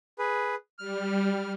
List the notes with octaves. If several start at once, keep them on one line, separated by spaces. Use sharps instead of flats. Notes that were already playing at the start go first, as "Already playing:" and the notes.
G#4 B4
G3 F6